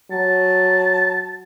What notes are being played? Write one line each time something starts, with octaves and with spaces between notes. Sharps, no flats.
F#3 A5